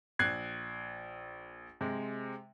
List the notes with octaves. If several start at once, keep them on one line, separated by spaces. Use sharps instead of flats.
A#1 F#6 G#6 C7
C3 G#3